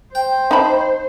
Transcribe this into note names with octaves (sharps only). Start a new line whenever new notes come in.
C5 G5
D#4 A5 B5